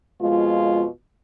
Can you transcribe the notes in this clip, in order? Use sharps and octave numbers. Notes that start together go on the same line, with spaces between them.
F2 B2 G#3 F4